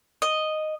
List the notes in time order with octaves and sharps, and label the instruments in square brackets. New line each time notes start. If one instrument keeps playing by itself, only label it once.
[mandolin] D#5